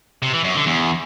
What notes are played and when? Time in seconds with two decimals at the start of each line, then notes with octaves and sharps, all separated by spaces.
0.23 C3
0.33 E3
0.44 F#2
0.55 D3
0.66 E2